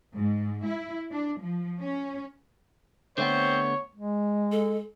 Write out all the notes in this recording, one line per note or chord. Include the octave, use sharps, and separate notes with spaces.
G#2
E4
D4
F3
C#4
D3 A3 B3 C4 C5 C#5
G#3
A4